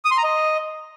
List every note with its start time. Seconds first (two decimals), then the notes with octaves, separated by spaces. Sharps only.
0.05 D#6
0.11 C6
0.17 A#5
0.24 D#5